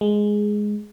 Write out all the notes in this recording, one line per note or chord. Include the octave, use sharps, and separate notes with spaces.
G#3